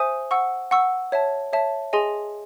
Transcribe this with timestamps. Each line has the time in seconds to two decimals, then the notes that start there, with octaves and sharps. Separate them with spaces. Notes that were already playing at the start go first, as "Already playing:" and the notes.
Already playing: C5 E5 G#5 D#6
0.31 F#5 C#6 E6
0.71 F#5 C#6 E6
1.12 C#5 E5 A5
1.53 C#5 E5 A5
1.93 G#4 D#5 G#5 C6